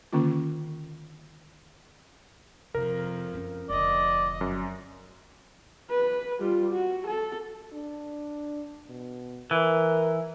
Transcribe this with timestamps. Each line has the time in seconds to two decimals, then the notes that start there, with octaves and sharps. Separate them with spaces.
0.13 D3 D#3 A#3 C#4 F4
2.75 F2 C3 A#4
3.32 F#2 C#4
3.70 F1 F2 D3 D5 D#5
4.41 F#2
5.91 B4
6.40 G3 F4
6.73 F#4
7.07 A4
7.73 D4
8.88 B2
9.51 E3 A#4